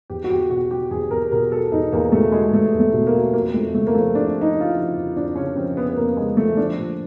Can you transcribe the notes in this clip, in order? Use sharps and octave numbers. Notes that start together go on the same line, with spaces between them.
E2 G4
F#4
E2 G4
B2 F#4
F#3 G4
E2 G#4
E2 A#4
B2 A#4
F#3 A4
E2 D#4
E2 A#3
B2 A3
F#3 G#3
E2 A3
E2
A3
B2
A#3
F#3
F2 A#3
F2 A3
C#3 A3
A#3
F3 A3
F2 D4
F2
D#4
C#3
F4
E4
F3
F2
F2 D4
C#3 C#4
F3 C4
F2 B3
B3
F2 A#3
C#3 G#3
F3 A3
F3 D4
A#2